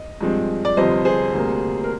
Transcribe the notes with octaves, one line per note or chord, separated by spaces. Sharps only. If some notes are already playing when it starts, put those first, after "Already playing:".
Already playing: D#5
G2 F3 G#3 C4
D5
G1 F2 C3 F3 C5 D#5
G#4 C5
D2 C3 G3 A#3
A#4